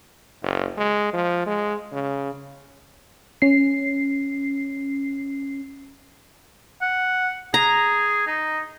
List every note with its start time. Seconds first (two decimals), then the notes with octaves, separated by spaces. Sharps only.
0.42 F#1
0.78 G#3
1.13 F3
1.46 G#3
1.92 C#3
3.42 C#4 C7
6.82 F#5
7.54 G#4 A#5
8.27 D#4